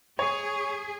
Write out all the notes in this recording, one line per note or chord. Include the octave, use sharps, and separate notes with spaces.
G#4 C#5